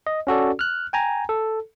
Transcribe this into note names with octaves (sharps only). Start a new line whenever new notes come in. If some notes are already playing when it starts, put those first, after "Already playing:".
D#5
C#4 F#4 A4 D5
F6 F#6
G5 G#5 A#5
A4